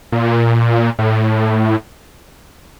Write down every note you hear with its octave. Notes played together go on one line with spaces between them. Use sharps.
A#2
A2